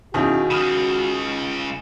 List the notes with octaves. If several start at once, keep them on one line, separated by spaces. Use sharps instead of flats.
D#2 B2 D#3 C#4 E4 F#4 G#4
C#2 C#3 B5 D#6 F6